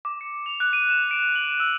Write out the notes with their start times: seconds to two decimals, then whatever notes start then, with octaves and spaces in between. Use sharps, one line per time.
0.05 D6
0.21 C#7
0.46 F7
0.60 F#6
0.73 D#7
0.90 E7
1.11 D7
1.36 F#7
1.60 E6